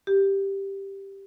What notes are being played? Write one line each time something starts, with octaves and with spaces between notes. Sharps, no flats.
G4